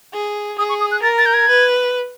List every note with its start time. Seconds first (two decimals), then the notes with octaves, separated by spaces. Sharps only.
0.13 G#4
0.58 G#4 D#6
0.69 C#6
0.81 D#6
0.92 F#6
1.03 A#4 A6
1.18 A6
1.26 G6
1.34 G#6
1.49 B4